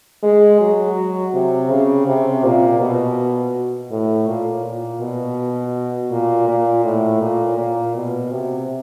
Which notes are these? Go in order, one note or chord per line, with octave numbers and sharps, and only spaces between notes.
G#3
F#3
C3
C#3
C3
A#2
B2
A2
A#2
A#2
B2
A#2
A#2
A2
A#2
A#2
B2
C3